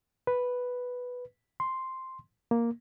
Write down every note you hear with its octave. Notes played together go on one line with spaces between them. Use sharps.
B4
C6
A#3